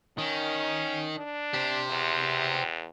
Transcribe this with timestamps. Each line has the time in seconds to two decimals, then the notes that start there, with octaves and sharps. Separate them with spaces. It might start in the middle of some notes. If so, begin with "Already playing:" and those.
0.18 D#3 C#4
1.17 D4
1.53 G4 C5
1.91 E2